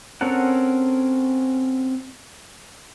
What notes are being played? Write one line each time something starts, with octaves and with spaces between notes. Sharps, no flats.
C4 C#4 A4 A#4 F#5